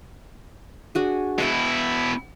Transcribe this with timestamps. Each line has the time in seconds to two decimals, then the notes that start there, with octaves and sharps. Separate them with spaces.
0.95 D4 F#4 G#4
1.38 B2 E4 D#5 F#5 G5